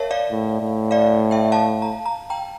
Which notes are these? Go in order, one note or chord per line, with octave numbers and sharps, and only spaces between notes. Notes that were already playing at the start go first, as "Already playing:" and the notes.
Already playing: A#4 C#5 E5 F5 A5
D5 F5
A2
A2
D5 F5
E5 G5
F5 A5
A#5
A#5
G5 A#5